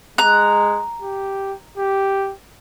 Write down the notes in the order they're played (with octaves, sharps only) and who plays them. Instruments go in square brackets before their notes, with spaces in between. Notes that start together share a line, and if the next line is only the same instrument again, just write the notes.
[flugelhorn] G#3 [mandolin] A#5 F#6
[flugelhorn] G4
G4